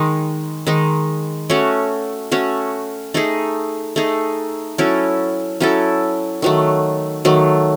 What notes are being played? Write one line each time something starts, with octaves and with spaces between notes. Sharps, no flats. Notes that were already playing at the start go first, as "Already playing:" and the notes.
Already playing: D#3 G#3 D#4
D#3 G#3 D#4
A3 C#4 F#4 C#5
A3 C#4 F#4 C#5
A3 D#4 G#4
A3 D#4 G#4
F#3 C#4 E4 A4
F#3 C#4 E4 A4
D#3 F#3 A3
D#3 F#3 A3